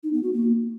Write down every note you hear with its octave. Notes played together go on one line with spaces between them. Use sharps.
D#4
B3
F#4
A#3